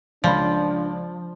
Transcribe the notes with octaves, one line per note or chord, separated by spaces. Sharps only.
C#2 F3 D4 D5 B5